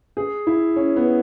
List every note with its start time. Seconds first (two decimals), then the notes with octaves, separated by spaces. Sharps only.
0.17 G#4
0.47 E4
0.76 C#4
0.96 B3